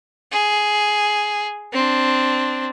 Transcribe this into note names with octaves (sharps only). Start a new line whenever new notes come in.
G#4
C4 D4